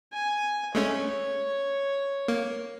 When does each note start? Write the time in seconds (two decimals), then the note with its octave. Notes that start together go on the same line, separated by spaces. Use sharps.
0.13 G#5
0.75 G#3 A3 C#4 C#5
2.28 A#3